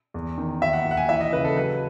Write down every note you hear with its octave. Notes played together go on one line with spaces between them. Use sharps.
E2
D#3
D#2 E5
F#5
D#2
F#5
G#5
E3 E5
D#5
C#3 B4
A4
F#3 B4